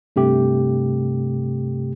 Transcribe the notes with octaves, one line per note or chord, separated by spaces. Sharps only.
G2 C3 A3 G4